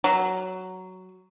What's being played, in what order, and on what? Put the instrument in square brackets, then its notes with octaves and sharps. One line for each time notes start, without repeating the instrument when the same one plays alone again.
[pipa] F#3